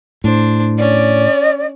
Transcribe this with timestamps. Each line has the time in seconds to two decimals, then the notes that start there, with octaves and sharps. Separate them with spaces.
0.24 A2 D4 C5
0.78 C#4 D5